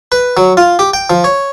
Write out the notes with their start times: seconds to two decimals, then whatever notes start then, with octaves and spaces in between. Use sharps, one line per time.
0.12 B4
0.37 F#3
0.57 F4
0.79 G4
0.94 G5
1.10 F3
1.24 C#5